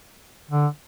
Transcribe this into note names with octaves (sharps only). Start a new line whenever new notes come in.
D3